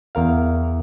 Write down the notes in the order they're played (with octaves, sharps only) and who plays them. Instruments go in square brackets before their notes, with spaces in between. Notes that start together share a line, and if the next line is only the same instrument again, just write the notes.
[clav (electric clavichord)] E2 A#4 F5